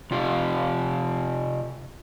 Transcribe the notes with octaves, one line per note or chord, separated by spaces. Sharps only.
C3 F4 G4